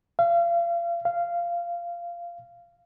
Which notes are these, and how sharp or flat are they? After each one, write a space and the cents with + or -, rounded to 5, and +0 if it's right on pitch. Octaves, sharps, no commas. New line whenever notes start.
F5 -35
F5 -15